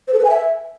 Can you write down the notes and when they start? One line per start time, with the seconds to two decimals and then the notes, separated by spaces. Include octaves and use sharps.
0.08 C5
0.13 A4
0.19 B4
0.24 G#5
0.30 E5